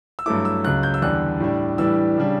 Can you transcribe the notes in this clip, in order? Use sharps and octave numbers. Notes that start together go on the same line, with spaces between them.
E6
G2 F#3 A3 E4 D6
E6
C#2 C#3 F#3 F#6
G6
E6
E2 D3 G3 D4 F#6
A2 G3 D4
A2 E3 G3 D4 E6
C#3 G3 D4